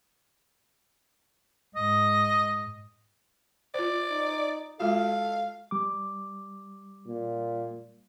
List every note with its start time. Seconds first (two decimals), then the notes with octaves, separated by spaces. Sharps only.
1.76 G#2 D#5
3.74 F4 C5 D5
4.11 D#4
4.80 G#3 F4 F#4 A4 F5
5.71 G3 D6
7.07 A#2